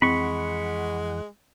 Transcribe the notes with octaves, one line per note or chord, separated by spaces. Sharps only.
F2 E3 G#3 C4 F#5 B5 C#6